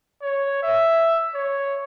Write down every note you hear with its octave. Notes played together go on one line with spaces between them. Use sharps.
C#5
E5
C#5